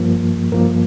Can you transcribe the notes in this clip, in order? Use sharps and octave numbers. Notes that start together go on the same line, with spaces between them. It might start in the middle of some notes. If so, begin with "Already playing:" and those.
Already playing: G2 F3 A#3
G2 F3 A#3 A#4